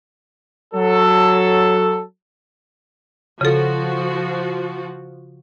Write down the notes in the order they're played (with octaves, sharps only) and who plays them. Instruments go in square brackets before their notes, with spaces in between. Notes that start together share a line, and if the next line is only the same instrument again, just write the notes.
[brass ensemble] F#3 A4
[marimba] C#3 A4 [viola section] F3 F#4